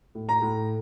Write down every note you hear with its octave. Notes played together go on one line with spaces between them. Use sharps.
A2
A#5
A2